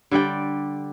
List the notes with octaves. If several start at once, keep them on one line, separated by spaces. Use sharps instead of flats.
D3 G3 D5 G5